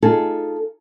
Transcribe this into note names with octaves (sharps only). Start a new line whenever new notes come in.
D#4 F4 G#4 A4